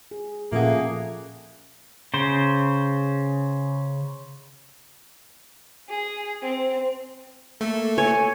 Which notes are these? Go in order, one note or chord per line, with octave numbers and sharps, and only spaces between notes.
G#4
A#2 F3 A3 A#3 C#4 G#4 F#5
C#3 C5
G#4
C4
A3 A#3 A4
C#5 G#5